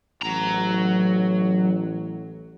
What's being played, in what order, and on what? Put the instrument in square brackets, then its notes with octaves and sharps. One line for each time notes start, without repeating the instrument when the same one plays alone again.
[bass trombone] A1 [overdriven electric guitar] F#3 A#5